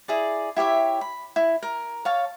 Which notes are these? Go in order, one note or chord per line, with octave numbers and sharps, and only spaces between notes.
E4 G#4 D5
E4 G4 C#5 E5
B5
E4
A#4
C#5 F5 A5